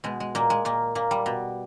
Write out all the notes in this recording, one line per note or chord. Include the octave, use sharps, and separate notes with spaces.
B2 G#3
G#3
A#2 A#3
G#3
A#2 A#3
A#2 A#3
G3
B2